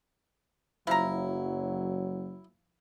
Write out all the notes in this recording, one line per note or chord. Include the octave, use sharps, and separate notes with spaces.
F#1 F3 F#3 E4 A#5